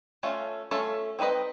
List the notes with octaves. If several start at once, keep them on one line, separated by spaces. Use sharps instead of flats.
A3 C#4 F4 A4
A3 C#4 F4 A4
C4 D#4 F#4 B4 D#5